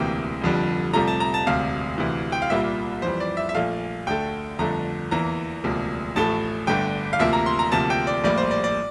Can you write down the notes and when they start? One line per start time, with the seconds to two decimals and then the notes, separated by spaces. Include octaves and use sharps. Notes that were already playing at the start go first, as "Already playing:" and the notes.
Already playing: E1 D2 C3 E3 A#3 G5
0.41 F1 F2 D3 G3
0.94 C2 C3 F3 A3 A#5
1.07 A5
1.20 A#5
1.34 A5
1.46 E1 D2 C3 F5
1.98 D2 C3 E3
2.32 G5
2.42 F5
2.50 C2 A#2 G3 A#3 E5
3.02 F2 E3 G3 C5
3.20 D5
3.37 E5
3.49 E5
3.55 A#1 A#2 A3 F5
4.06 D2 D3 A3 G5
4.59 G1 F2 D3 A3 A#5
5.11 E2 E3 A#3 A#5
5.64 E1 D2 C3 F3 A#3
6.16 A1 A2 F3 A3 A5
6.67 G1 G2 D3 A3 G5
7.13 F5
7.19 D2 C3 F3 A#3 E5
7.33 A#5
7.46 C6
7.59 A#5
7.72 D2 C3 F3 A#3 A5
7.90 G5
8.07 D5
8.24 A#1 A2 G3 A#3 D5
8.38 C5
8.51 D5
8.64 D5